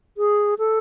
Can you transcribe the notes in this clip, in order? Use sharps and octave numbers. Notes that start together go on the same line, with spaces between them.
G#4
A4